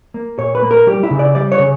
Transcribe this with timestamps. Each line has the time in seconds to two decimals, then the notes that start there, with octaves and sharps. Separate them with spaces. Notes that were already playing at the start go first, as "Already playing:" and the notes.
0.14 A#3
0.39 A#2 C#5
0.55 B4
0.62 A#3
0.71 A#4
0.87 G3 G4
1.03 E4
1.11 C#3
1.19 D5
1.35 G3 D5
1.52 C#5
1.59 C#3